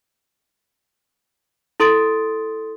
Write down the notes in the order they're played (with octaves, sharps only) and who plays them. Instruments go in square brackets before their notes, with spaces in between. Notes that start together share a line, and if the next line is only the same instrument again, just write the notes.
[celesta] E4 A4 C6 D#6 A6 D7